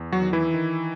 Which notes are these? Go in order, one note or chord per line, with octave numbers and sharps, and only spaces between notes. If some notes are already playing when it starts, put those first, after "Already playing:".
Already playing: E2
F#3 F#4
D#3
E3 E4
D#3